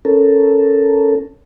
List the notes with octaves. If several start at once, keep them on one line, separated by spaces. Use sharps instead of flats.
C#4 A4 A#4